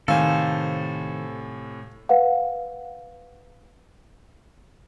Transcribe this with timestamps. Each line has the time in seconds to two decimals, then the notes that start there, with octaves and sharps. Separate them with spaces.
0.08 A2 C3 D#3 A4 C5 F5 G#5
2.09 B4 F5 F#5